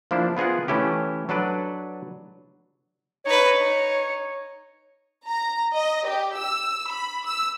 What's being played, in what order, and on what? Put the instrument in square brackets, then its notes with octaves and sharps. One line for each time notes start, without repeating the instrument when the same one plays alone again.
[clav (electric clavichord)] F3 A#3 D4 E4 C5
B3 F4 G#4 A#4 F#5
E3 A3 C#4 E4 G4
F#3 D4 A4 B4 D5
[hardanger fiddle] D#4 B4 [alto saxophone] C#5
[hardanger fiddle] D#4
[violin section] A#5
D#5
G4
E6
B5
E6